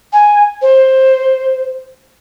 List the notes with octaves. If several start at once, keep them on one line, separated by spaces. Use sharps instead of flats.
G#5
C5